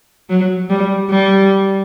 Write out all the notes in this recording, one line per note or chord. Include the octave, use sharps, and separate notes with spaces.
F#3
G3
G3